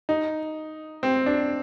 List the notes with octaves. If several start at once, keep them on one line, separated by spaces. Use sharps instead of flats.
D#4
C4
D4